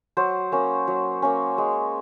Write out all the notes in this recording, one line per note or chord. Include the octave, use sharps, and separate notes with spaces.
F#3 C5
A#3 C#4
F#3
A#3 C#4
G#3